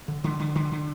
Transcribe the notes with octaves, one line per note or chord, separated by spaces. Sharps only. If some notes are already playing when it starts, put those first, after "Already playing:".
D3
D3
D3
D3
D3